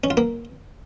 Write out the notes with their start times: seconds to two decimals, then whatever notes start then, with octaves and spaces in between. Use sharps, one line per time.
0.04 C#4
0.10 F4
0.17 A#3